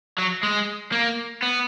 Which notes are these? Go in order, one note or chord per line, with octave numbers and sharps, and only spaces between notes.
F#3
G#3
A#3
B3